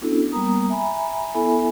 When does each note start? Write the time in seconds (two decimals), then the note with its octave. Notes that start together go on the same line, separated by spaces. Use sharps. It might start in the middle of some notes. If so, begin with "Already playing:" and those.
0.01 B3 C#4 D4 E4 F#4 A4
0.32 G3 A#3 B3 A#4 A#5 D#6
0.70 E5 G#5 A#5 B5
1.35 B3 E4 A4 E5 G#5 B5